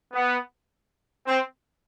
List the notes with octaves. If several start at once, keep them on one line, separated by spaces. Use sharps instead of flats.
B3
C4